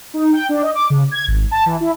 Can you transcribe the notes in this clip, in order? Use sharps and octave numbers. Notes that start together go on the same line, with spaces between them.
D#4
G5
D4
D#5
D6
C#3
G#6
G#1
A5
E3
E4